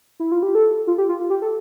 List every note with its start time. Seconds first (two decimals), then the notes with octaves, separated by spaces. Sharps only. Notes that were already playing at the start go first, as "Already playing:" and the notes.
0.20 E4
0.32 F4
0.43 G4
0.55 A4
0.87 F4
0.98 G4
1.09 F4
1.20 F4
1.30 G4
1.42 A4